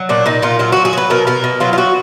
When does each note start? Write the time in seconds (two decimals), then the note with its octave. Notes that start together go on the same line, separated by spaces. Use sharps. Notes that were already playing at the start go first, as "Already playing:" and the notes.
Already playing: F#3
0.09 A#2 D4
0.26 A#2 D#4
0.42 A#2 F4
0.59 F#3 F4
0.72 F#3 F#4
0.85 G#4
0.93 F#3 B4
1.10 B2 A#4
1.27 B2 A#4
1.44 B2
1.60 F#3 F4
1.73 F4
1.78 F#3 F#4